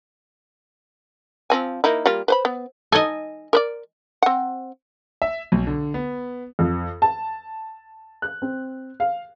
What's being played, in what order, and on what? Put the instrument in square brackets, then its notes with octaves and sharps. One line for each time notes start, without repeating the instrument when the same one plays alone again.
[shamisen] F3 C4 G#5
A#3 D#4 E4
G3 A#3 F4
B4 C5 B5
B3
[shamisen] D#4 A4 [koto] D#5 G#5
[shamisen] A#4 B4 D5
C4 F#5
[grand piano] E5
B1
D3
B3
[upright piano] F2
A5
F#6
C4
F5